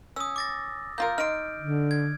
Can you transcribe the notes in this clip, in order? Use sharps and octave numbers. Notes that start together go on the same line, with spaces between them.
C#4 D#6 E6
D6 A6 A#6
A#3 F4 A#4 G6
D#4 C6 F6 D7
D3
G#6